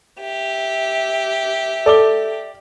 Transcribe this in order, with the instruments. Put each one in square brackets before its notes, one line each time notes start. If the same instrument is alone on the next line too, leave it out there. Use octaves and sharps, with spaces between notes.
[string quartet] G4 [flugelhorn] E5
[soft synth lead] A4 [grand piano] D5 D6 G7